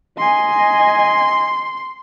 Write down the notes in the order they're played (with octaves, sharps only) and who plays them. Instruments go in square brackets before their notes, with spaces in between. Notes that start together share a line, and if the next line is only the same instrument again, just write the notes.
[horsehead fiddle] D#5 G#5 [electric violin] C6